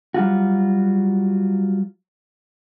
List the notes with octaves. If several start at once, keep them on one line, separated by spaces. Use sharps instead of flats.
F#3 G3 F4 F#4